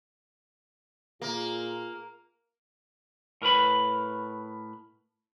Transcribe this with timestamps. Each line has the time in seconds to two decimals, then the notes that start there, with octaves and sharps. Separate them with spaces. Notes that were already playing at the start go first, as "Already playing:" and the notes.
1.22 A#2 A#3 F4 G#4
3.42 A2 A#4 B4 B5